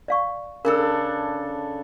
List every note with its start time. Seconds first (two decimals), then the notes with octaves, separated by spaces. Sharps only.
0.08 D5 F5 C#6
0.65 C#3 D4 A4 A#4 E6